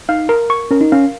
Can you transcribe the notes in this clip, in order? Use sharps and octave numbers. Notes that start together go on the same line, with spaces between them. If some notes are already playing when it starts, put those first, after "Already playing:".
D#4 F5
A#4
C#6
C#4 A#4
D#4
C#4 F5